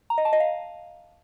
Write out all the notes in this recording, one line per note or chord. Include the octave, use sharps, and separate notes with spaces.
A#5
D#5
A5
D#5
F5